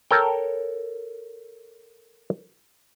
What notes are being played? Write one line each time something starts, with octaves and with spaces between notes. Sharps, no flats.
A4 A#4 C#5 G5